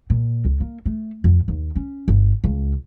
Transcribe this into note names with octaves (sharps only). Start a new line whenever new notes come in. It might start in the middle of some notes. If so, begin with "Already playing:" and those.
A#2
C#2
A#3
A3
F2
D#2
C#4
G1
C#2